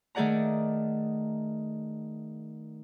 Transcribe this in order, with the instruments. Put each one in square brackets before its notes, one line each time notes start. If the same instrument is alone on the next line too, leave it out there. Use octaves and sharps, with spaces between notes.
[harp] D#3 A3 G#4 D5 F#5 A#5